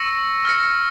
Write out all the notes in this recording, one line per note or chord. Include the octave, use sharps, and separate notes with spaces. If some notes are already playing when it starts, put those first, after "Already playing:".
Already playing: C#6 E6 A#6 C#7 E7
F6 A#6 C#7